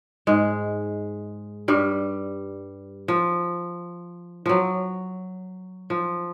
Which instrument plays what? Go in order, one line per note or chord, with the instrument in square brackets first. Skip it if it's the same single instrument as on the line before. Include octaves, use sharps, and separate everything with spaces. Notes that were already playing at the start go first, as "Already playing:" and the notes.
[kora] G#2 G#3
G2 G3
F3
F3 F#3
F3